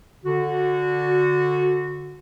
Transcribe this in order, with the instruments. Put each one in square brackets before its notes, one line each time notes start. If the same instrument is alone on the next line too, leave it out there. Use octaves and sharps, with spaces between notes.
[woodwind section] D3 F#4